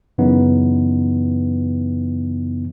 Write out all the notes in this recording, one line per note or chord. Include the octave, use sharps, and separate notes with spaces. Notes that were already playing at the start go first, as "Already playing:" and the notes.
F#2 C#3 E3 B3 D#4